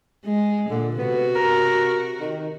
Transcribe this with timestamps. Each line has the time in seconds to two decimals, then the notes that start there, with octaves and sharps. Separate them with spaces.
0.24 G#3
0.70 A#2 D3
0.98 C3 B3 F#4
1.36 A#4
2.21 D#3